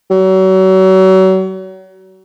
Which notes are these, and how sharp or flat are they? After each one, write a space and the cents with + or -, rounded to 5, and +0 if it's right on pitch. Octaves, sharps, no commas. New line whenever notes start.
F#3 +35